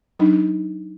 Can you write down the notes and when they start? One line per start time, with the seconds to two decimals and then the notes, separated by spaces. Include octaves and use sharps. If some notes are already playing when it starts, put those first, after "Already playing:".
0.19 F#3 D4 D#4